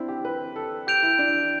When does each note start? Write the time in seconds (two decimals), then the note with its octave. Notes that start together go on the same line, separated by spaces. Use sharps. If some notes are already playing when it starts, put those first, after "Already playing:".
Already playing: C4 D4 E4
0.09 G4
0.25 B4
0.56 A4
0.87 G4 G6 D7 F7
1.03 E4
1.19 D4